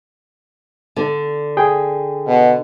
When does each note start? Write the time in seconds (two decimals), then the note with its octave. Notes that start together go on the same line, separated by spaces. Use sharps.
0.96 D3
1.57 G#4 G5
2.27 B2